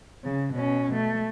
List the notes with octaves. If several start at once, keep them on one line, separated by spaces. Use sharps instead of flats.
C#3
B2 C#4
A3